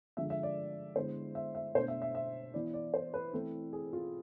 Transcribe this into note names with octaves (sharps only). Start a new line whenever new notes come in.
D3 F3 G#3 E5
E5
D5
D3 G#3 B3 E4 C5
E5
E5
B2 A3 D4 C5
E5
E5
E5
E3 B3 E4 D5
D5
C5
B4
E3 A3 C4 E4 A4
G#4
F4